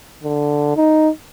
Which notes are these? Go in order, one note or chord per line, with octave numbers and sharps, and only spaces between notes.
D3
D#4